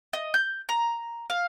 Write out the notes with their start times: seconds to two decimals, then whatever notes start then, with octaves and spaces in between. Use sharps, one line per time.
0.13 D#5
0.34 G6
0.69 A#5
1.30 F5